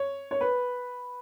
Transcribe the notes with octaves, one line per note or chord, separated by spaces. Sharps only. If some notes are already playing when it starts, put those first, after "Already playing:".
Already playing: C#5
C#5
B4